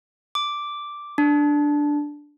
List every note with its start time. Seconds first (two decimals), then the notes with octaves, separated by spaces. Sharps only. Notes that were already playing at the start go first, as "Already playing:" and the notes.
0.35 D6
1.18 D4